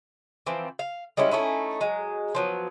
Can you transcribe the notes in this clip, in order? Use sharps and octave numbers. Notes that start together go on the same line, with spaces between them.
E3 F3 C4
F5
G3 G#3 C#4 E4
A3 C#4 D#4 E4
F#3 G#3
F3 F#3 B3